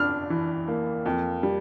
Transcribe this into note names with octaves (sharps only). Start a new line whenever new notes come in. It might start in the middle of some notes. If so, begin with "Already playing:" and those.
Already playing: F2 D4 F6
E3
A#3
F2
G3